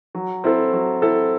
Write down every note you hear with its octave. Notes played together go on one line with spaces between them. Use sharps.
F#3
C4 E4 A4
F#3
C4 E4 A4